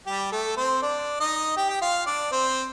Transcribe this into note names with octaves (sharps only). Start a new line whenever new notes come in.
G3 G4
A3 A4
C4 C5
D4 D5
D#4 D#5
G4 G5
G5
F4 F5
D4 D5
C4 C5